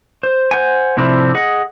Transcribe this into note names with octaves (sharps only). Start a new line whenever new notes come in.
C5
C5 F#5 G#5
A2 C3 F3 C4 D4 E4
G#4 D#5 F#5